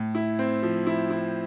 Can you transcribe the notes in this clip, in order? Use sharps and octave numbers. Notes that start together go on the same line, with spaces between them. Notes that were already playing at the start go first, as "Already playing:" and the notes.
Already playing: A2
E4
C4
F3
E4
E4